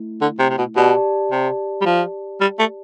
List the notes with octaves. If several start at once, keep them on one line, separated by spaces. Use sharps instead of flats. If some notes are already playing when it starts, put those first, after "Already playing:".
Already playing: A3 E4
D3
C3
C3
B2
B2 G4 D5 A5
C3
G3
F3
G3
A3